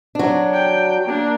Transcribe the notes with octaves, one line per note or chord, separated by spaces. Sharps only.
F#3 D4
G5
A#3 D4